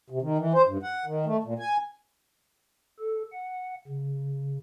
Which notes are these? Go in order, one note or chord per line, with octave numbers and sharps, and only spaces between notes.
C3
D#3
E3
C5
G2
F#5
D#3
A3
A#2
G#5
A4
F#5
C#3